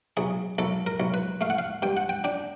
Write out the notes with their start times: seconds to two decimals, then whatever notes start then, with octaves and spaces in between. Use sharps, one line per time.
0.17 B1 G#4
0.58 B1 A4
0.87 A#4
1.00 B1
1.14 B4
1.41 A3 F5
1.50 F#5
1.59 F5
1.82 G2 G5
1.97 F#5
2.09 G5
2.24 D4 G5